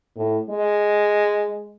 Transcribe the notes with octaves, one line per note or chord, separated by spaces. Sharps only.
A2
G#3